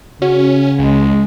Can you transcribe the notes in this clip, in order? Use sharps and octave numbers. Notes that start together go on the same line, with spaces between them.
C#3 C#4 F#4
C#2 G#3